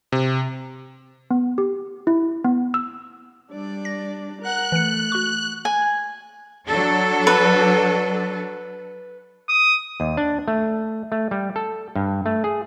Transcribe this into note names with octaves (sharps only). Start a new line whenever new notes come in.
C3
B3
G4
E4
B3
E6
G3 D4 D5
A#6
A#4 F#5 F#6
E3 A3 C#7
F#4 C#6
G#5
F#3 D4 A4
B4
D#6
D#2
D4
A3
A3
G3
A4
G2
A3
G#4